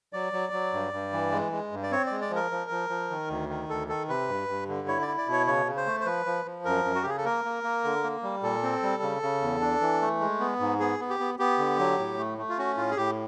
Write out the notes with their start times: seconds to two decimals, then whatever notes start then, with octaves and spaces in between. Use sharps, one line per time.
0.13 F#3 D5
0.33 F#3
0.53 F#3
0.73 G2
0.93 G2
1.13 E3
1.32 G#3
1.52 G#3
1.72 G2
1.83 D5
1.91 C4 C#5
2.06 G#3 D5
2.21 D5
2.30 F3
2.36 A#4
2.51 F3
2.70 F3
2.90 F3
3.10 D#3
3.29 D2
3.49 D#3
3.69 D2 A4
3.89 D#3 A4
4.09 C3 B4
4.29 G2
4.49 G2
4.68 D3
4.88 E4 C#5
5.02 D5
5.07 E4
5.17 D5
5.27 B2 C#5
5.47 C#3 C#5
5.66 C#3
5.77 C5
5.86 A3
6.00 C5
6.05 F3 B4
6.26 F3
6.45 F3
6.65 F#2 A#4
6.85 F#2
6.95 F#4
7.03 G4
7.05 C#3 G#4
7.18 A4
7.25 A#3 A#4
7.45 A#3
7.64 A#3
7.84 D3
8.04 A#3
8.23 G3
8.43 A#2 A4
8.63 C4
8.83 G3
9.02 C#3
9.23 C#3
9.42 E2
9.61 D4
9.81 E3
10.02 A3
10.20 G#3
10.40 B3
10.60 G#2
10.80 B3 G#4
11.00 B3
11.10 G4
11.19 B3
11.39 B3 G4
11.58 D3
11.79 F#3
11.99 A2
12.18 A3
12.38 A3
12.49 F4
12.58 C#4 F#4
12.77 A2 F4
12.91 G#4
12.97 A2 G4